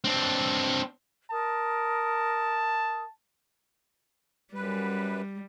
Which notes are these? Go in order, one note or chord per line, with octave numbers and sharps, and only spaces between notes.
C4 D4
A#4 A5 D#6
F#2 G3 B4